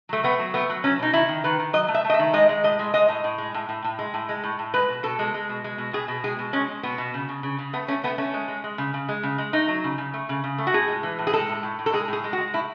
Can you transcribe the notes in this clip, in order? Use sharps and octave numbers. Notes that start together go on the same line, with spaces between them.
F#3 A3
A3 B3
F#3
A3 B3
F#3
F#3 C#4
B2 D#4
D#3 E4
D#3
D#3 B4
D#3
F#3 D#5
A3
E5
A3
D#5
E5
D#3
G#3 D#5
G#3
A2 D#5
G#3
G#3 D#5
A2
A2
G#3
A2
A2
A2
G#3
A2
G#3
A2
A2
G#3 B4
B2
B2 A4
G#3
G#3
B2
G#3
B2
B2 G#4
B2
G#3 G#4
B2
G#3 C#4
G#3
B2 B3
B2
C#3
C#3
C#3
C#3
A3 B3
A3 C#4
A3 B3
A3 C#4
G#3
G#3
G#3
C#3
C#3
G#3
C#3
G#3
A3 D#4
F#3
C#3
C#3
A3
C#3
C#3
A3
F#4
A2 G#4
G#3
E3
A2
G#4
G#3 A4
A2
A2
A2
A4
G#3 G#4
A2 G#4
G#3
F#4
G#3
A2 E4